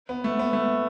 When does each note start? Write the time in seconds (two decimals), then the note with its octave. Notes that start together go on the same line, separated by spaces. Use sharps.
0.09 B3
0.24 A3
0.39 B3
0.53 A3